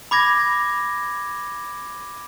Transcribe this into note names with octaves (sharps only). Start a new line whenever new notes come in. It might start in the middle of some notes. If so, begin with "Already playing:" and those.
B5 D6 G#6 A#6